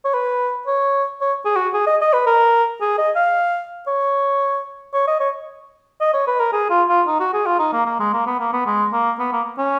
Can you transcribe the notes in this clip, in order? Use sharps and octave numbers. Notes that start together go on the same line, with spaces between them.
C#5
B4
C#5
C#5
G#4
F#4
G#4
D#5
D#5
B4
A#4
G#4
D#5
F5
C#5
C#5
D#5
C#5
D#5
C#5
B4
A#4
G#4
F4
F4
D#4
F#4
G#4
F4
D#4
A#3
A#3
G#3
A#3
B3
A#3
B3
G#3
A#3
B3
A#3
C#4